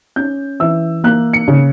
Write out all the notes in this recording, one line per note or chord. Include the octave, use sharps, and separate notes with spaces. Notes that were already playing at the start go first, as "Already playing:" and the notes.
C#4 G6
E3 E6
A#3 F#6
C#7
C#3